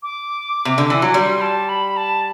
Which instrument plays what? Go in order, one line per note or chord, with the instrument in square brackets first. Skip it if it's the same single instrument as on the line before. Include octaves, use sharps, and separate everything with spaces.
[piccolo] D6
[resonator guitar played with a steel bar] C3
D3
E3
F#3
[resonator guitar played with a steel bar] G3 [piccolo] C6
[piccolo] A5
B5
A5